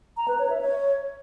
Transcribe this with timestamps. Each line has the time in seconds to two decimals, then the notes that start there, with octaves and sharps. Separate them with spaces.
0.17 A#5
0.28 B4
0.39 C#5
0.50 E5
0.61 C#5